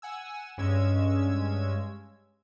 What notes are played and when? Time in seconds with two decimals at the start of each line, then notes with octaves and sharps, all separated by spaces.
0.02 F#5 G#5 E6
0.58 G2 G#3 C#4 E6 G#6